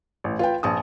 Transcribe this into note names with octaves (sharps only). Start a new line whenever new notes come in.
A1
F4 B4 G5
A#1 A5 D#6